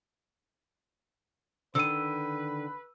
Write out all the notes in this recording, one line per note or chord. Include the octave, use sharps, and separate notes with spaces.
D3 D#3 B4 E6 D#7